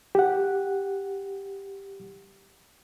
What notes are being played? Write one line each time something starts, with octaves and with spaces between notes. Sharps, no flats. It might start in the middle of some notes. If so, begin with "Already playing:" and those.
G4 F#5